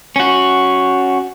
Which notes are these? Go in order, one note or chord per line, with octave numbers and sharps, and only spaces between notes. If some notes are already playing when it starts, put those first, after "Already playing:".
C#4 F#4